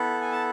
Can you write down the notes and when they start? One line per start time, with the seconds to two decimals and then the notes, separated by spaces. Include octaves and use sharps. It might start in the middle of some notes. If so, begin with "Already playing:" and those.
Already playing: B3 E4 A4
0.21 G#5
0.32 A5